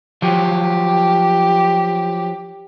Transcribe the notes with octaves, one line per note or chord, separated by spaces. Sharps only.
F3 F#3 G4